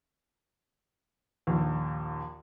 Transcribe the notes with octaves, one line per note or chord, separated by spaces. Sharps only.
A#1 D#2